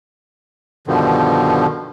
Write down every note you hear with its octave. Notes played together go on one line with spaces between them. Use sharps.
G2 B2 D3 D#3 F3